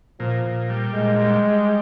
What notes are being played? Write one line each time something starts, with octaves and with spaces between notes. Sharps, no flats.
A#2 F3
A#2
G3
A#2 G#3
G3
G3